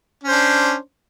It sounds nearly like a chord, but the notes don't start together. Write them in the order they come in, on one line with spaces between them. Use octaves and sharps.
C#4 C5 D4